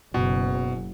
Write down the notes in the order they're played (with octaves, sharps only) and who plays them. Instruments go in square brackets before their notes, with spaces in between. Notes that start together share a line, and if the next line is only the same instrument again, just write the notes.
[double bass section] F#1 [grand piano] B2